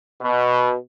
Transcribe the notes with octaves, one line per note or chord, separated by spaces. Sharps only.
B2